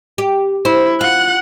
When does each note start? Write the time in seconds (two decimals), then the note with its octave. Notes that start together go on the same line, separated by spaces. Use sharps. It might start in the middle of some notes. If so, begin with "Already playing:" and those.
0.18 G4
0.65 E4 C5
1.01 F4 F#5 F#6